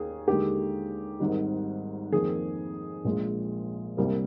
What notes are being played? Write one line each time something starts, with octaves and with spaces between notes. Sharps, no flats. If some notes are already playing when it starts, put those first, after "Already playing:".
Already playing: D#2 D#3 G#4
D#2 D3 G#3 G4
G#1 G#2 D#3 G3
F2 D#3 A#3 G#4
A#1 A#2 G#3
C2 C3 G3 A#3